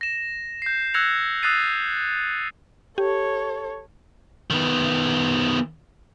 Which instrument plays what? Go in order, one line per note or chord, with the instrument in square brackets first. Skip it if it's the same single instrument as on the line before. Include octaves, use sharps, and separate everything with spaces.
[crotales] A#6 E7
G6 C7
E6 F#6 G#6 A#6 C#7 F7
D#6 E6 F#6 A6 C7 D#7
[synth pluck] G4 [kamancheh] A4 C#5
[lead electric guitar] D#3 B3